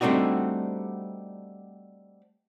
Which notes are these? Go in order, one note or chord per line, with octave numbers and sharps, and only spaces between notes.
G3 A3 C4 D4 D#4 F#4